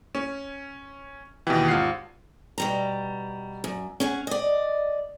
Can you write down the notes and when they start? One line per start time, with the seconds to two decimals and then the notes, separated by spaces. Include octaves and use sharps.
0.15 C#4
1.47 D#2 B2 E3 G4
1.68 G#1 F4 F5 F#5 C7
2.58 B2 G3 A#5
3.64 F#2
4.00 C#4 G#4 F#5
4.27 D5 D#5